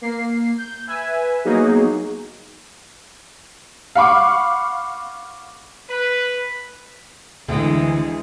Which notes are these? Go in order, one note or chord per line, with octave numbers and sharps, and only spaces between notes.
A#3 C7
G6
B4 E5 G#5
F#3 A#3 B3 D#4 F#4 G#4
F5 F#5 B5 C#6 D6
B4
D2 D3 E3 G#3 G5